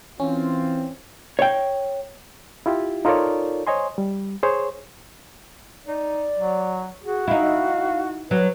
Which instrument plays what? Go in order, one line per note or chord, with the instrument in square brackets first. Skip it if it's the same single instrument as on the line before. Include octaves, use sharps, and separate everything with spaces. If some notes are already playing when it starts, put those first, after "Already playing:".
[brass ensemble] E3 C4 F4 [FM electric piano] C#4
[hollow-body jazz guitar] C#5 G5
[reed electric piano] E4 F4 G4
D#4 F4 A4 A#4 C#5 D5
C5 C#5 D#5 G#5 C6
G3
G#4 C5 C#5
[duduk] D#4 [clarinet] D5
[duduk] F#3
[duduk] F#4 [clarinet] G#4
[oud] D#4 E4 [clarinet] F5
[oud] F#3 [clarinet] B4